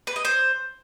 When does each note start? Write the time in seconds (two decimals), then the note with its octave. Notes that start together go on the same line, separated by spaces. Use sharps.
0.07 B4
0.16 D#5
0.25 C5